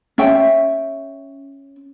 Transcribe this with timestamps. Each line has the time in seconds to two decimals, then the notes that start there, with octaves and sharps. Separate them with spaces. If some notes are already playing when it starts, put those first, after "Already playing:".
0.18 C#4 E5 G5